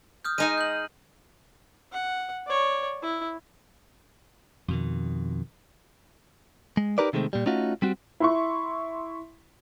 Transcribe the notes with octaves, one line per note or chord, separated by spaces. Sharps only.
D#6 F6 G6
G#3 D#4 G#5 D#7
G6 F#7
F#5
C#5 D5
E4
F2 B2 D#3
G#3
D#4 G4 A#4 B4 D5
C3 D#3 G#3 A3 C4
A#2 G3
A3 C#4 D#4 F4 F#4
G3 C4 F#4
E4 C6 C#6